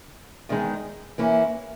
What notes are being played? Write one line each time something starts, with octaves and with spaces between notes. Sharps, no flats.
E2 D#3 G#3 D#4
E3 A#3 C#4 E4